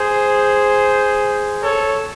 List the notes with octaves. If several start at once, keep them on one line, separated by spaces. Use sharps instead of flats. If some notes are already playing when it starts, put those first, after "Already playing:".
Already playing: G#4 C5
A4 C#5